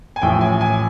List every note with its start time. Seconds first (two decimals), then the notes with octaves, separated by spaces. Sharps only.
0.16 G#5
0.22 A1 A2 F3 G5
0.41 G#5
0.61 G#5